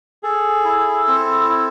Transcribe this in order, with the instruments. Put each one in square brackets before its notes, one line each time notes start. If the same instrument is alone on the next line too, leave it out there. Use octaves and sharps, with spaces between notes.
[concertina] G#4 A4
E4
C4
E4